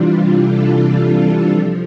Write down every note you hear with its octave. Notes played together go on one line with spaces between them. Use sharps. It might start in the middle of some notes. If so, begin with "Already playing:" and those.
Already playing: C3 E3 G3 D4 F4
A4
F3